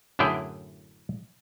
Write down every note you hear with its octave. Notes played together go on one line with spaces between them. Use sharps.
F#2 A2 D3 E4 G#4 G5